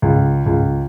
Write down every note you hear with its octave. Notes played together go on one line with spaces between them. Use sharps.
C#2
C#2